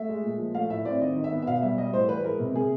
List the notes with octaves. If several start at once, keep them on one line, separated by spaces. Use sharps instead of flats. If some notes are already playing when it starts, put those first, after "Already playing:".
Already playing: A3 E5
G#3
A#2
F3
A3 F5
A2 E5
C4 D5
D#3 D#5
D#3
E5
B3
E5
B2 F5
G3 E5
G3 D#5
A2 C5
E3 B4
G#3 A#4
C3
C3 G#4